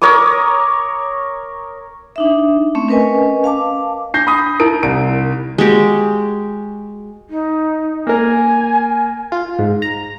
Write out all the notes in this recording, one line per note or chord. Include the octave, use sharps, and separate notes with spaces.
A#4 C#5 D6 D#6
D4 D#4 E5
A3 C4 C#4
C#4 A#4 B4 D#5 G#5
F5 A5 D6
D4 G6 A#6 C7
B5 D#6 A#6
D#4 E4 A#4 D7
C2 D7
G#3 F#4 G4
D#4
A#3 A#4 G#5
F4
G#2
A#5